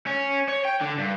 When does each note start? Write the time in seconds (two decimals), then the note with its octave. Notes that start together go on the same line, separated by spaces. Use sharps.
0.07 C#4
0.48 C#5
0.65 G5
0.81 D3
0.98 G2